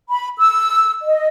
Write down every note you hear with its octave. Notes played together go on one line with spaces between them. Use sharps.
B5
E6
D#5